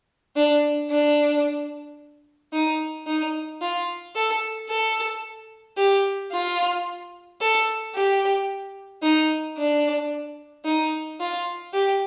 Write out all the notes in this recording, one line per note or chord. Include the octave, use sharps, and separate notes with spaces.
D4
D4
D#4
D#4
F4
A4
A4
G4
F4
A4
G4
D#4
D4
D#4
F4
G4